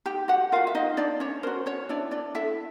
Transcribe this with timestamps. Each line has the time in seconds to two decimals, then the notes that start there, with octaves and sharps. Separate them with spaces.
0.06 D#4 G4 G5
0.28 F#4 F#5
0.52 F4 F#4 A#4 F5
0.67 E5
0.75 D#4 D#5
0.97 D4 D#4 D5
1.20 C#4 C#5
1.43 F#4 A#4 C5
1.66 C#4 C#5
1.89 D4 E4 D5
2.11 D4 D5
2.35 E4 A4 E5